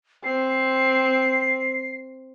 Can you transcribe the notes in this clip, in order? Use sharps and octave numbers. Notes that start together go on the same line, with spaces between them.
C4 C7